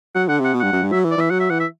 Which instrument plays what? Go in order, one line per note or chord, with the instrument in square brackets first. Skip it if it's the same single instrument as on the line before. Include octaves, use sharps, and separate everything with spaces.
[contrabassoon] F#3 [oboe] F#5
[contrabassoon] D3 [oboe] F#5
[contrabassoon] C3 [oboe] F#5
[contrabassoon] B2
[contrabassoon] G2 [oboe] F#5
[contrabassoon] F#2
G2
[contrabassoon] F#3 [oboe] E5
[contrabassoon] E3
[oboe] D5
[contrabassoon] E3 [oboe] E5
[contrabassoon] F#3 [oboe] F#5
[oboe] E5
[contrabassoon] E3 [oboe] F#5
[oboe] E5